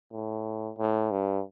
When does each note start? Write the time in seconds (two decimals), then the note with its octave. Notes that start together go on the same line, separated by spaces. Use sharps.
0.12 A2
0.78 A2
1.11 G2